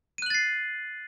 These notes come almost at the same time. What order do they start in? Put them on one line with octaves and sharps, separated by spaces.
D#7 F#6 F#7 A6 C7